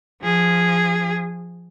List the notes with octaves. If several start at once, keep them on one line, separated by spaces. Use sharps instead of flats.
F3 G#4